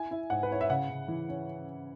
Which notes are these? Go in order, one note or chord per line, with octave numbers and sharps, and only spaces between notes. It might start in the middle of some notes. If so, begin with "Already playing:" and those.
Already playing: E4 G#5
E4
G#2 F#5
B4
E4 C#5
E5
C#3 F#5
C#3
E3
C#4